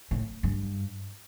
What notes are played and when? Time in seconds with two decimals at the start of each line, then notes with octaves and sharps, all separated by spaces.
0.11 A2
0.43 G2